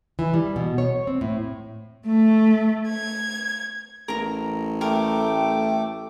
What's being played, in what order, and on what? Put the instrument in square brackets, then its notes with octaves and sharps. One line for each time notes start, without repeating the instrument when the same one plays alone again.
[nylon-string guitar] E3
G3
B2
C#5
C4
A2
[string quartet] A3
G#6
[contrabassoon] A1 [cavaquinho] A#4 A#5
[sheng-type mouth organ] A3 D6 [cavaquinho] A#4 [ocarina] G5